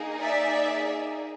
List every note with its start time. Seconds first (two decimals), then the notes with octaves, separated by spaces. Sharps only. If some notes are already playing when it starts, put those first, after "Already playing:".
Already playing: A#3 D#4 G#4
0.22 D5 E5